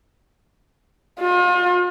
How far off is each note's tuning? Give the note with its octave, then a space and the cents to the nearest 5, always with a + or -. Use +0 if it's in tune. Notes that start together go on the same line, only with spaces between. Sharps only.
F4 +40